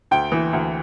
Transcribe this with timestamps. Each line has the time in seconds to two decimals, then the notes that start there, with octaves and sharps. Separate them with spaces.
0.11 D2 G5
0.32 E3
0.53 D2